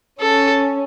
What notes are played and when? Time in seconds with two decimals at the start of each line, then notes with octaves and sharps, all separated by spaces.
0.20 C#4 A4